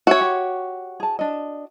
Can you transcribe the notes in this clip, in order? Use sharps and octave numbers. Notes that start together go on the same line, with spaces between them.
C#4 F#4 C#5 E5 G#5
G4
G#4 A5
D4 D#5